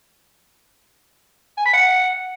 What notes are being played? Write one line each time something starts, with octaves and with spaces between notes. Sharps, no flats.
G#5
B5
F#5